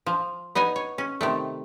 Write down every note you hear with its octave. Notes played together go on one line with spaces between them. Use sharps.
F3
B3 D#4 D#5 G#5
C#5
C#4
C3 D#3 A3